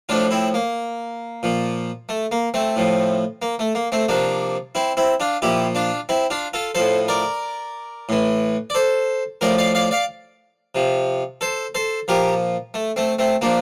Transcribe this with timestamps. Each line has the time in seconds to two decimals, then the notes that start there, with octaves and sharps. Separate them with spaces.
0.09 A2 F3 D4 F4
0.31 C4 E4
0.54 A#3
1.43 A#2 F3
2.09 A3
2.32 A#3
2.54 A3 C4
2.76 A2 F3
3.42 A#3
3.59 A3
3.75 A#3
3.92 A3 C4
4.09 C3 F3 A#3 D4
4.75 C4 E4
4.97 C4 E4
5.20 D4 F4
5.42 A#2 F3 E4 G4
5.75 D4 F4
6.09 C4 E4
6.30 D4 F4
6.53 F4 A4
6.75 A2 F3 A4 C5
7.08 A#4 D5
8.09 A2 E3
8.70 D5
8.75 A4 C5
9.41 A2 F3 A#4 D5
9.58 D5 F5
9.75 D5 F5
9.91 D5 F5
10.75 C3 F3
11.41 A4 C5
11.75 A4 C5
12.08 A#2 F3 G4 A#4
12.74 A3
12.96 A3 C4
13.19 A3 C4
13.41 A#2 F3 A#3 D4